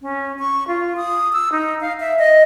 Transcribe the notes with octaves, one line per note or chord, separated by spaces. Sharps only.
C#4
C#6
F4
D#6
E6
D#4
F5
E5
D#5